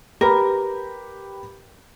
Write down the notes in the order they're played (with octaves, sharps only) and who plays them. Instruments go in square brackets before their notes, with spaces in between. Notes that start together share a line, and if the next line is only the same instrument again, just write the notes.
[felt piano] G4 B4 B5 [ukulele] A#4